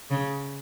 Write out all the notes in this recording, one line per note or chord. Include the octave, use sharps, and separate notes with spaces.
C#3